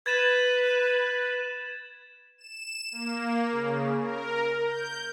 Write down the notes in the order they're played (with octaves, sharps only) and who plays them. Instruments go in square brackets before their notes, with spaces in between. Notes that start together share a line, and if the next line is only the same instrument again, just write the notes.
[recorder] B4 [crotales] G#6 A6 E7
[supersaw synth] E7
A#3
C#3
A#4
G6